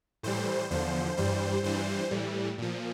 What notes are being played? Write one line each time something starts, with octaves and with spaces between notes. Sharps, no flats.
A2 E3 G3 C5
E2 D3 F3 C5
G2 E3 G3 C5
G2 E3 G3 C5
A2 E3 G3
A#2 F3